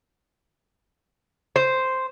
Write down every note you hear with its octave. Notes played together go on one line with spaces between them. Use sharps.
C5